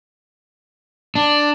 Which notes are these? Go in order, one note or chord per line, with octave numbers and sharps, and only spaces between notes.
D4